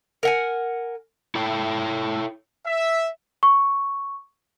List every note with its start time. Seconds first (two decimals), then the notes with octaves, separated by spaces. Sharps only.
0.23 A#4 F#5 G#5
1.35 E4 A4 C#5 G5
2.65 E5
3.43 C#6